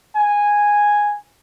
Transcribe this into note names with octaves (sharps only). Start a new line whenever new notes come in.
G#5